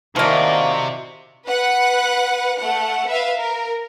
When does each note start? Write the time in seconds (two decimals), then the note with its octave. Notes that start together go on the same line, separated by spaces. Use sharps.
0.16 C3 D#3 F3 A#3 E4 F#4 D5
1.47 B4 F#5 F#6
2.58 A3 F#5
3.07 B4 E5 F5
3.39 A#4